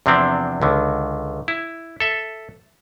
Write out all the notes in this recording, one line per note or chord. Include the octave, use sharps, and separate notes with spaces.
E2 C3 F3 C4 D4 E4
C#2 D3 D#3
E4
A4 E5